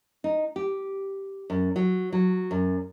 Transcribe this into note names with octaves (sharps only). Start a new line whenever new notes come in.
D#4
G4
F#2
F#3
F#3
F#2